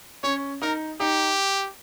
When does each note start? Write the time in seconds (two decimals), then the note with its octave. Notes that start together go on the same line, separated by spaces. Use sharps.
0.23 C#4 C#5
0.62 D#4 A#4
1.00 D#4 G4